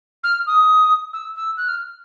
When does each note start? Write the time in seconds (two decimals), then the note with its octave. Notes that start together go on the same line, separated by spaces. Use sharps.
0.23 F6
0.46 D#6
1.13 E6
1.35 E6
1.57 F#6
1.68 F6